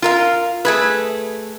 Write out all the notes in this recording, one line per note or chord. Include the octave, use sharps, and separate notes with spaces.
F4 A#4 F5
A3 G#4 B4